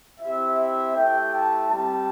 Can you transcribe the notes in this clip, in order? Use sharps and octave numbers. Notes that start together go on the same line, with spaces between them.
C4 E4 G4 E5
E5
A3 E4 G4 G5
A5
G3 C4 G4 A5